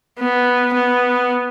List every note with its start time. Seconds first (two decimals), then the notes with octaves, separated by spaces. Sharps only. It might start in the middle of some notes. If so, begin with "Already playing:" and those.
0.19 B3
0.74 B3